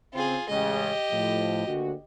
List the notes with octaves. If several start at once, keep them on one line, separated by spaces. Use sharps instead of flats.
C#3 C4 F4 G#4
A1 C#3 G#3 G4 D#5
A2 F3
D2 A#2 F#4